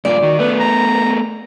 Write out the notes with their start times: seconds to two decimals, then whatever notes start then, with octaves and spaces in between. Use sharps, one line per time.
0.05 G2 A#2 F4 D5
0.23 D#3 F#4
0.39 A3 B3 B4
0.60 A#5